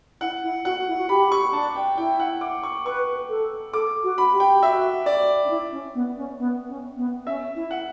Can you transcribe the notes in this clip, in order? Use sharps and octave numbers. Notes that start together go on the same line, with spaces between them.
E4 F#5
E4
F#4 F#5
E4
F#4
G4 B5
C#6
D4 A5
G5
E4 G5
F#5
D6
C#6
B4 C#6
A4
A4 D6
F#4
B5
G4
G5
F#4 E5
D5
D4
E4
C#4
B3
C#4
B3
C#4
B3
C#4 E5
E4
F#5